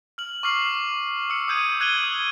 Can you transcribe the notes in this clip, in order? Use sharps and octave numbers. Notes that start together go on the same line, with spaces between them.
F6 F#7
C#6 D6 F6 C7 F#7
E6 C#7
D#6 E6 G6 G#6 D#7
F#6 G#6 D#7 F#7 G7
D#6